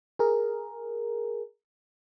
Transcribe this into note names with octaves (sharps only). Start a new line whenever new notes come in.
G#4 A#4